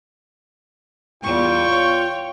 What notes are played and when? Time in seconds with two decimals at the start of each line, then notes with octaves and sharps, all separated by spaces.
1.24 E2 G3 F4 G5 C#6
1.70 C#5